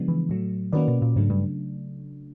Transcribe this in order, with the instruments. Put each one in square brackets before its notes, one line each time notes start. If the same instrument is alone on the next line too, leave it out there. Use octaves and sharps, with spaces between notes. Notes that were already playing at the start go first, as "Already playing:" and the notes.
Already playing: [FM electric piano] C#3 F3 G#3 B3 D4
[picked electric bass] E3
[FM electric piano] A2 F#3 A3
[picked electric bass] D#3 [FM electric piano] A#3 C#4 F#4 B4 D5
[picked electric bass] B2
A#2
[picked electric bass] G#2 [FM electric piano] C#3 F#3 A3 D4
[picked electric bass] G2